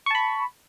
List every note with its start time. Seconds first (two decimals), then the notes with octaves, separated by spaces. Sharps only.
0.06 C#6
0.11 A5
0.15 B5